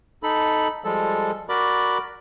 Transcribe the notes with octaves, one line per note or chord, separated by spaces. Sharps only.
D#4 A4 B5
F3 G3 G#3 A4
F#4 A#4 D5 B5 D6